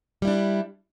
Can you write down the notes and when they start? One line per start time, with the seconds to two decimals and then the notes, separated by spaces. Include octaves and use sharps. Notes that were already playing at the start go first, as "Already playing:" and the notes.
0.22 G3
0.25 E4
0.27 D4